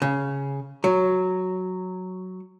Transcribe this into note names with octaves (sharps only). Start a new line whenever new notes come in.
C#3
F#3